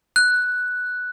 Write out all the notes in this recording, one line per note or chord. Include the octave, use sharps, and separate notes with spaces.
F#6